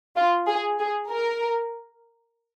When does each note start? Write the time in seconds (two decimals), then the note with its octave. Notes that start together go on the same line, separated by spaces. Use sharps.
0.16 F4
0.47 G#4
0.79 G#4
1.09 A#4